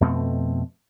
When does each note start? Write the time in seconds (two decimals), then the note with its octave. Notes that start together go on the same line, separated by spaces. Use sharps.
0.01 F2 B2 A3 C4